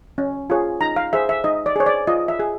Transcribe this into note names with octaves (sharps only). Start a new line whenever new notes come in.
C#4
F4 G#4 C#5
D#4 A#5
F5
G#4 C5 E5
E5
D#4 D#5
D5
G#4 C5 C#5
D5
F4 D#5
E5
G#4